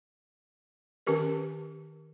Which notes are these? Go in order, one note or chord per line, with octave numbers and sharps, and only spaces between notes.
D#3 C#4 G4 A#4 B4